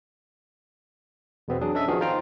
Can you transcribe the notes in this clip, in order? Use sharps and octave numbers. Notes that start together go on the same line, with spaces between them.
E2 B2 B3 C4
F#3 D4 G#4
C#4 D4 A4 D#5 E5
D#3 F3 B3 F#4 G#4 A#4
D#4 F4 C5 F5 G5 A#5